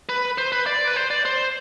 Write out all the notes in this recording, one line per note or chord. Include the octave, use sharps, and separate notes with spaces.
B4
C5
B4
D5
B4
C5
D5
C5